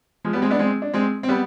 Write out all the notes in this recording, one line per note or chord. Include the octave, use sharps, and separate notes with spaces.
F3 G#3
G3 B3
G#3 C4
B3 D4
G#3 C4
D4
G#3 C4
C4
G3 B3